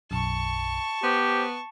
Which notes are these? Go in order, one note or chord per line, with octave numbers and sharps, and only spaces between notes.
B1 F#2 A5 C#6
B3 G4 C5